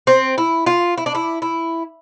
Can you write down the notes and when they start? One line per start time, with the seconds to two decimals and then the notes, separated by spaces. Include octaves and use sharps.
0.07 C4
0.38 E4
0.66 F4
0.98 E4
1.06 D4
1.15 E4
1.42 E4